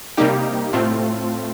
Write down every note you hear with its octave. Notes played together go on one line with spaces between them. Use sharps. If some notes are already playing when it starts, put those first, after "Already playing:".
C3 G3 A#3 D#4 G4
A2 A3 C4 F4